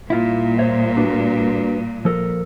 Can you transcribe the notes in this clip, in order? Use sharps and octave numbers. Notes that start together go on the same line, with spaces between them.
A#2 G3 E4 F4
C5 C#5 E5
D4 F#4 B4
F3 A4 A#4